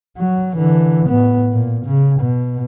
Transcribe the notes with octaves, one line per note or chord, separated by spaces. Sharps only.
F#3
D3 E3
A2 B3
A#2
C#3
B2